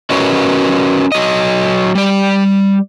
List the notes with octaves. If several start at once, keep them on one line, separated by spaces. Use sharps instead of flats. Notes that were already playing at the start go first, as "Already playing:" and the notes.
C#4 F#4 A#4 B4 C#5 D#5
F#3 D#5
G3 D5